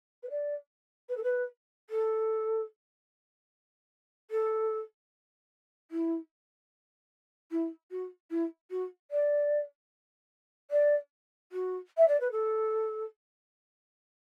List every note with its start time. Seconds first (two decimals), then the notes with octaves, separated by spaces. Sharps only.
0.23 B4
0.30 D5
1.09 B4
1.17 A4
1.23 B4
1.90 A4
4.30 A4
5.91 E4
7.51 E4
7.91 F#4
8.30 E4
8.70 F#4
9.11 D5
10.71 D5
11.52 F#4
11.97 E5
12.08 D5
12.20 B4
12.31 A4